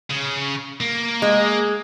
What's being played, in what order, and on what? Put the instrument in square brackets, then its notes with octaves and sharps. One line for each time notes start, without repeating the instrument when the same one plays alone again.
[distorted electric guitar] C#3
A#3
[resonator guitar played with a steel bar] G#3